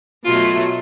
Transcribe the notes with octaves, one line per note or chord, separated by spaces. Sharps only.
B2 F#3 A3 F4